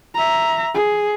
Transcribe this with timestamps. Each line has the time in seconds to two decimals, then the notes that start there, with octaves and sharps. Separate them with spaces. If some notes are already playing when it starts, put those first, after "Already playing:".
0.15 E5 A#5
0.75 G#4